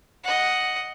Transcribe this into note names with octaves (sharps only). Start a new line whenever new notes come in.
D#5 F#5